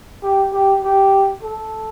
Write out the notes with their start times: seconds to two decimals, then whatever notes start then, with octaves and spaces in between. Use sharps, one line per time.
0.23 G4
0.53 G4
0.83 G4
1.43 A4